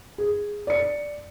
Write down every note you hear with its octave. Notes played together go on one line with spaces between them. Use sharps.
G#4
D5 C#7